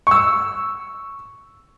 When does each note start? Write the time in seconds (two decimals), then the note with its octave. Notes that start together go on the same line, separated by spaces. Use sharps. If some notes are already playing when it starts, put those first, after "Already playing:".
0.07 C#6 E6